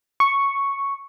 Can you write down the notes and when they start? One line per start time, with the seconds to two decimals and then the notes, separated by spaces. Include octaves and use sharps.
0.20 C#6